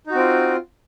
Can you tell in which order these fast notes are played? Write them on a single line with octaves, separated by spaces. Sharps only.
D#4 F#4 C4 F4